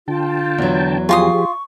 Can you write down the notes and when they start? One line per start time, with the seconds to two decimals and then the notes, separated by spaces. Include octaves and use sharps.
0.08 D3 F4 G5 A5
0.58 E2 F#3
1.09 F3 F4 G4 G#4 C6 C#6 D#6